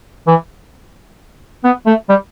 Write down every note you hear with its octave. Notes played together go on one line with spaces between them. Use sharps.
E3
B3
A3
G3